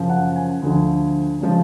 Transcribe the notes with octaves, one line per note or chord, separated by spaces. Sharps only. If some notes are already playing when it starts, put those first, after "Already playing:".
Already playing: F#2 C#3 F3
F#5
G#5
D2 D3 F3
C#3 F3 G#3 C#4